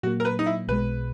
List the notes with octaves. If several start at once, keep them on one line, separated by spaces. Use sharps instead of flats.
A#2 F#3 A#3 F#4
A#4
B4
D#4
E4
B1 B2 G#3 B4